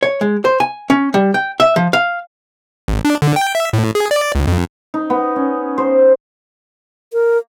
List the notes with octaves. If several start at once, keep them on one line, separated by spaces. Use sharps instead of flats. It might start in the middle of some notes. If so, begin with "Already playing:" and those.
C#5
G#3
C5
G#5
C#4
G3
G5
E5
F3
F5
G#1
D4
D3
G5
E5
A2
G#4
D5
C#2
F2
D#4
B3
C#4
C5
A#4